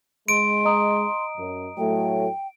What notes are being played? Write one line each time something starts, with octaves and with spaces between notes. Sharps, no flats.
G#3 C6 D7
D#5 A#5 D#6
F#2
A2 F#3 A3 G5